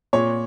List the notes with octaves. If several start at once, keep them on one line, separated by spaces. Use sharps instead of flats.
A#2 C#5